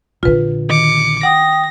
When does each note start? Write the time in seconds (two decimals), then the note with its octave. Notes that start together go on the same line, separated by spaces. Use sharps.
0.23 A#1 D3 F4 B4
0.70 D#3 D6 C#7
1.23 F#5 G5 D#6 A#6